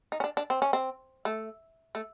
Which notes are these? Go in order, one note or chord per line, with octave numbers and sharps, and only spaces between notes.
D#4
C#4
D4
D4
C4
C#4
C4
A3
A3